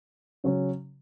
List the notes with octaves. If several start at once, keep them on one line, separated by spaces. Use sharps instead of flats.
C#3 F#3 C#4